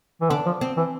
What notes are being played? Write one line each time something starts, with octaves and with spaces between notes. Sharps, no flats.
E3
D3 D4
F3
C4
E3